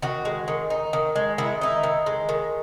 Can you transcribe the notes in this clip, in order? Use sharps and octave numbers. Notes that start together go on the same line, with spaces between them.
D#3 F#4
G#3
D#3
D#4
D#3
G#3
D#3 E4
D#4 E4
D#3
G#3
D#3